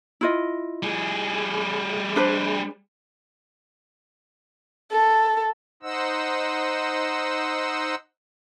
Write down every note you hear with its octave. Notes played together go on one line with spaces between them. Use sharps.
E4 F4 D#5
G3 G#4
D4 B4 C5
A4
D#4 C5 D#5 F#5 E6